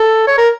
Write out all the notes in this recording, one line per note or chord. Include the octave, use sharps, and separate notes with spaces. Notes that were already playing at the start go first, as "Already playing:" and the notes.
Already playing: A4
C#5
A#4